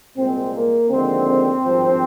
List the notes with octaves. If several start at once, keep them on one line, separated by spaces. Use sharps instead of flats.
C2 A#2 G#3 C4
A#3
D#2 D3 F3 G#3 C4
G#1 G2 F3